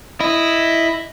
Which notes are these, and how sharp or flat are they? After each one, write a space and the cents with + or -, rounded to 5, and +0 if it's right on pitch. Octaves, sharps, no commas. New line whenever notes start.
E4 +0 D#5 +0